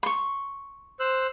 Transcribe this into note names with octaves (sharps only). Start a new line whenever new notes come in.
C6 C#6
C5 E6 F#6